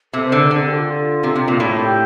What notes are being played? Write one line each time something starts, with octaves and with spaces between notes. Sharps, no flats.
C3 A4
C5
D3
A#4
D3 A4
G4
F4
C3
C3
A#2
A2 G4